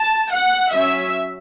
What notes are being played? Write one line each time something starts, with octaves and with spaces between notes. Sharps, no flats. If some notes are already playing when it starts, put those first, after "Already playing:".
Already playing: A5
F#5
F#3 C#4 E5